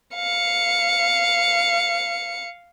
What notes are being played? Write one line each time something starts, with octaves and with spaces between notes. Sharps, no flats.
F5 C#7